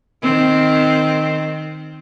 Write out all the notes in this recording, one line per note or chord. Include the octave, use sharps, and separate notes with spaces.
D#3 C4